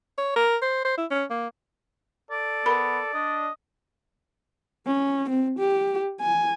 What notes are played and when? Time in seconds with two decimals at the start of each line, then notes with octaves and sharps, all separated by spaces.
0.18 C#5
0.36 A#4
0.62 C5
0.85 C5
0.98 E4
1.11 C#4
1.30 A#3
2.31 A4 D5
2.66 B3 A#4 B5
3.14 D4 D#5
4.87 C#4
5.30 C4
5.59 G4
6.21 G#5